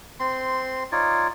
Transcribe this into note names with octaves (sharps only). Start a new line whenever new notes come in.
C4 C6
D#4 F4 C#5 D5